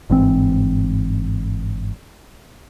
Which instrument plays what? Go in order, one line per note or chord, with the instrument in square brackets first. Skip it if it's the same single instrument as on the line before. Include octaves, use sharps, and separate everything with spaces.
[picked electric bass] G1 G#2 E3 C4